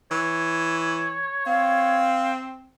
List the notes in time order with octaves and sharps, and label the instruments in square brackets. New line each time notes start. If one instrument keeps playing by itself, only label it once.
[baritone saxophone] E3 [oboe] C#5
[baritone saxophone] C4 [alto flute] F5